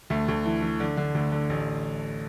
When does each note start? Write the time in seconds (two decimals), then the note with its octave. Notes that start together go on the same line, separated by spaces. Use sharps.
0.10 D2 A3
0.28 D2
0.46 E3
0.62 E3
0.80 D3
0.97 D3
1.15 D2
1.32 D3
1.50 A1